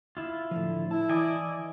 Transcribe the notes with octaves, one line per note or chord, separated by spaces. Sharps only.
E4 F4
A2 D3 F3
E4 A5
E3 D5 D#5 G#5